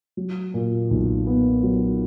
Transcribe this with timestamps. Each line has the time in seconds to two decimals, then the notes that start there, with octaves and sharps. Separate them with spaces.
0.17 F#3
0.54 A#2
0.91 B1
1.27 B3
1.63 F#3